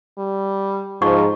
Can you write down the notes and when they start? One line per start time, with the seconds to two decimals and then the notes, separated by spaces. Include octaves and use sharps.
0.18 G3
1.02 G#2 F3 C#6